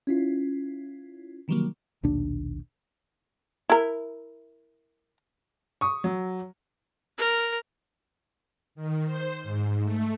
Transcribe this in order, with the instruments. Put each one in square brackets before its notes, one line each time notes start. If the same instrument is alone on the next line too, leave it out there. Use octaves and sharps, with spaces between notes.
[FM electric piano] C#4 E4 F4
C3 D#3 E3 F#3 G3 A#3
[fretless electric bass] A#1 D#2 B2 D4
[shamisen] E4 A#4
[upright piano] C#6 D#6
F#3
[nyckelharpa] A#4
[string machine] D#3
C5
G#2
A3